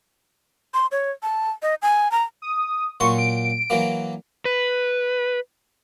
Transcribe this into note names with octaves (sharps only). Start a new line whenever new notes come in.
C6
C#5
A5
D#5
G#5
A#5
D#6
A#2 F#3 C6 C#6
D7
E3 F#3 A#3
B4